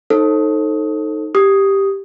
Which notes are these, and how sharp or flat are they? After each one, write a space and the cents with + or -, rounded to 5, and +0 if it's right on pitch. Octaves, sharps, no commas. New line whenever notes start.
D#4 +0 A4 +0 C5 +35
G4 +0 D#6 +0